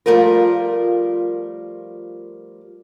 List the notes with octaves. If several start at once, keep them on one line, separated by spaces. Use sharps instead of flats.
F3 G3 A3 F4 A#4